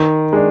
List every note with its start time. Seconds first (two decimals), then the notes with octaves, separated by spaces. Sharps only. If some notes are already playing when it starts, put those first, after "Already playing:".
Already playing: D#3
0.33 G#3 D4